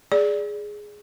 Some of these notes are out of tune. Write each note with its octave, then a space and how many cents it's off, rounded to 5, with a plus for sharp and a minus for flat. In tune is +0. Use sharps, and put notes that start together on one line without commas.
G#4 +0 D5 -10